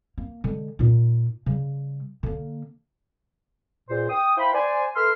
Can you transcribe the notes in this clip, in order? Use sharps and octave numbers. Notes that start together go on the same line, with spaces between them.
A#3
D3 G#3
A#2 D#4
C#3 G3
D3 A#3
C#2 A#2 C5
G5 D#6
E4 C5 F5 G5 B5
C5 D5 G#5
A4 B4 E5 C6 E6 F6